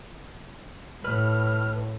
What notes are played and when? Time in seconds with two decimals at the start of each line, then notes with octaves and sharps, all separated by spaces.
1.04 A2 B4 B5 F6